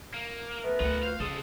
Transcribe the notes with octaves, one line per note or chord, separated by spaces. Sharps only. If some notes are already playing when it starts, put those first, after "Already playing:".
A#3
A3 B3 A#4 B4
D2 F4 F#5
F4 F#4 C5 F5
C#2 C#3 G#4 A4 C5 C6 D#6